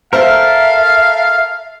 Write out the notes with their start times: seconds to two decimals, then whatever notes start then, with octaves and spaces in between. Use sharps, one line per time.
0.13 A4 A#4 C5 E5 F5